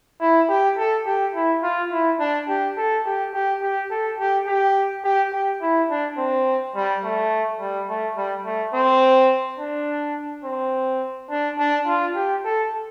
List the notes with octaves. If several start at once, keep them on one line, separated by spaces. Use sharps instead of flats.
E4
G4
A4
G4
E4
F4
E4
D4
G4
A4
G4
G4
G4
A4
G4
G4
G4
G4
E4
D4
C4
G3
A3
G3
A3
G3
A3
C4
D4
C4
D4
D4
F4
G4
A4